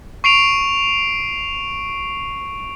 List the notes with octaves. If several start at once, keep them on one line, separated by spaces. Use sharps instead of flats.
C#6 C7 D7 F7